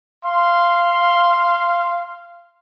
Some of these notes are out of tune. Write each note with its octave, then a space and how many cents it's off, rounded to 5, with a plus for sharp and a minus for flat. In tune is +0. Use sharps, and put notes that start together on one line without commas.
F5 -15 C6 +0